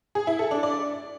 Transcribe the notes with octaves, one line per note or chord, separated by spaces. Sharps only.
G#4
E4
A4
D4
D5